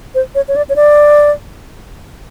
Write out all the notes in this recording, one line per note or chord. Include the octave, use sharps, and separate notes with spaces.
C5
C#5
C#5
D5
C#5
D5